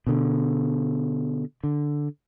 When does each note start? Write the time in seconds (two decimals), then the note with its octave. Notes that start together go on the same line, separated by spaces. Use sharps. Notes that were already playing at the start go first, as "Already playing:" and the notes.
0.07 B2 D3
1.64 D3